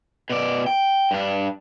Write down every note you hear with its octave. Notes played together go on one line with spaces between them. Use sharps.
B2 D5
G5
G2 D4